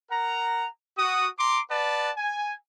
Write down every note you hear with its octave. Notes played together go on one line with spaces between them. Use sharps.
A#4 F#5 A#5
F#4 D#6
A#5 C6 D6
B4 D5 F#5 A5
G#5